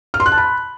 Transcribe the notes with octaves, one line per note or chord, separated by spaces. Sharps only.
F6
C6
F#6
A5
B5